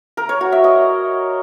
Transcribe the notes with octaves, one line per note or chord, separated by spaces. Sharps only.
A#4
C#5
F#4
E5
D#5